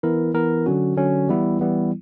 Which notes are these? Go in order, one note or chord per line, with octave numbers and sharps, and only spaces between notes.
E3 B3 E4 A#4
E3 B3 E4 A#4
D3 F#3 C#4 F#4
D3 F#3 C#4 F#4
E3 G3 B3 E4
E3 G3 B3 E4